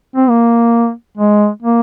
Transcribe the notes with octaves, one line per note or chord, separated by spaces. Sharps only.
C4
A#3
G#3
A#3